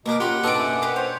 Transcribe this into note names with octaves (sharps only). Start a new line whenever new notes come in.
B2 A#3 A#4 C#6 D6
C#4 F4 G4 F#5 B5
B2 D4 D#4 A4 A5 D6
F#2
G4 B4 C6
C5 C#5